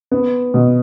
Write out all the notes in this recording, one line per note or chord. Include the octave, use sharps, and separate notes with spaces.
B3
B2